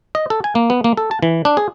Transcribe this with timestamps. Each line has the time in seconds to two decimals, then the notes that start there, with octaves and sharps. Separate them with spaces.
0.15 D#5
0.30 A4
0.44 G#5
0.55 A#3
0.70 B3
0.84 A#3
0.97 A4
1.11 A5
1.23 E3
1.45 D4
1.57 G#4